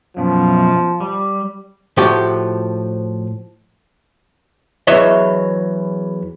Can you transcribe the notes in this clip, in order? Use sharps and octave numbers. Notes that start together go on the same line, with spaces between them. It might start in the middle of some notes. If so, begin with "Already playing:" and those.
F#2 B2 F3
G3
A2 F3 F#4 G4
E2 E3 F#3 C#5 D#5 E5